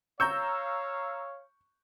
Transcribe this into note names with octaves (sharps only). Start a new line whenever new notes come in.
C#5 F5 A#5 C#6 E6 G6